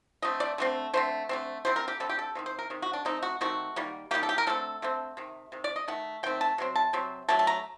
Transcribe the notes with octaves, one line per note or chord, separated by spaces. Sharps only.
D3 A3 C4 D#5
D5
D3 A3 C4
D3 A3 C4 C5
D3 A3 C4
D3 G3 C4 C5
A#4
G4
D3 G3 C4 A4
G4
A4
C3 D#3 C4
C5
A#4
C3 D#3
F#4
D4
D#3 A3 C4 D#4
F#4
D#3 A3 C4 F#4
D#3 G3 A#3
D#3 G3 A#3 G4
A4
G4
A#4
D3 A3 C4 A4
D3 A3 C4
C3 D#3
C3 D#3
D5
D#5
D#3 A3 F#5
D#3 A3 C4 G5
A5
C3 F#3 C4
A5
C3 F#3 C4
D3 F#3 A3 A5
A5
A#5